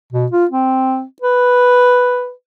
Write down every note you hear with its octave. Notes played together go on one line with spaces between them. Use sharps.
B2
F4
C4
B4